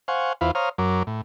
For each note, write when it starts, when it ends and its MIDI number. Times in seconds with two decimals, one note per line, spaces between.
0.08 0.33 72
0.08 0.33 77
0.08 0.33 78
0.08 0.33 80
0.08 0.33 85
0.41 0.51 40
0.41 0.51 64
0.41 0.51 65
0.41 0.51 71
0.41 0.51 72
0.41 0.51 77
0.55 0.69 72
0.55 0.69 73
0.55 0.69 77
0.55 0.69 82
0.55 0.69 87
0.55 0.69 89
0.78 1.03 42
0.78 1.03 54
0.78 1.03 70
0.78 1.03 86
1.07 1.21 45